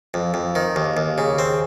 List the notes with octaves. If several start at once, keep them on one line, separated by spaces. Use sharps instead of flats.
F2
F2
D#3
D#2
D#2
C#3
C4